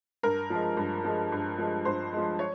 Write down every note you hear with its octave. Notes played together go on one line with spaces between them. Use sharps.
G2 A#4
F3 G#3
G2
F3 G#3
G2
F3 G#3
G2 C5
F3 G#3
C#5